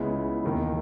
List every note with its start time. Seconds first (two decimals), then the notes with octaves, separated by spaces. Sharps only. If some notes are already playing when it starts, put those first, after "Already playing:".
Already playing: C#2 C#3 G#3 B3 E4
0.44 E1 D#2 D#3